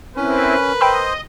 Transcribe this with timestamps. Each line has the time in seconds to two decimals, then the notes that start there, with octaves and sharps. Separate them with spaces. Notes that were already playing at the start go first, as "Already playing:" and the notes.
0.16 C4 C#4 E4 A#4 B4
0.81 C5 D#5 G5 B5 E6